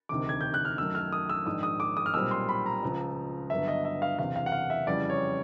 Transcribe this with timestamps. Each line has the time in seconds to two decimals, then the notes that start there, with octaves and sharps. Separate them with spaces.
0.09 E1 D2 C3 D#3 D6
0.29 G#6
0.41 G6
0.54 F#6
0.65 F6
0.78 F#2 D#3 F#3 A3 E6
0.95 F6
1.13 D#6
1.30 E6
1.46 A#1 G#2 D#3 G#3 D#6
1.63 D#6
1.80 D6
1.97 D#6
2.06 F6
2.14 B1 A#2 G3 C4 E6
2.31 C6
2.49 B5
2.66 A#5
2.83 C#2 C#3 F3
3.50 G1 G2 D3 F#3 B3 E5
3.68 D#5
3.85 E5
4.02 F5
4.19 F#1 E2 C3 F5
4.36 F5
4.46 F#5
4.52 F5
4.70 E5
4.87 F2 C#3 E3 G3 D5
5.10 C#5